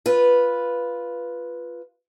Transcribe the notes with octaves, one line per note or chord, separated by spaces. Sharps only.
F4 B4